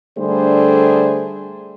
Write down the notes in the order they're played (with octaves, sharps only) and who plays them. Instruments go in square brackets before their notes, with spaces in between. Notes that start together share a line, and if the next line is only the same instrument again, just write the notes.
[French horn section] D3 G3 A3 D4 G#4 C5